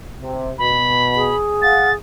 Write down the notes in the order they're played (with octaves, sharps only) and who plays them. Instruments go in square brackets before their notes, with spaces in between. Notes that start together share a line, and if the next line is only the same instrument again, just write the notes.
[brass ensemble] C3
[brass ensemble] B2 [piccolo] B5
[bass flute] G#4
[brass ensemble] F5 F#5 [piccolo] A6